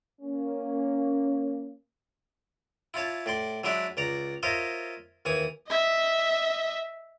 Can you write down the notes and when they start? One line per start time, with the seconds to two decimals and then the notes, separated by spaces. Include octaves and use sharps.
0.22 A#3 C#4
2.94 E4 F4 C#5 A5
3.26 A2 D5 C6
3.64 F#3 G#3 D4 E4 D5 E5
3.97 C#2 D5 A#5
4.43 F4 A#4 C5 C#5 D#5 E5
5.25 D#2 E3 G#5 C#6 D#6
5.68 D#5 E5